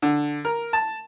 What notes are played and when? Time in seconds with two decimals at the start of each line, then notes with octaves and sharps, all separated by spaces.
0.02 D3
0.45 A#4
0.73 A5